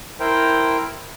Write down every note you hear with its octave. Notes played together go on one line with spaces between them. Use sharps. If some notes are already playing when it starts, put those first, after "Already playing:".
E4 A#4 C5 G5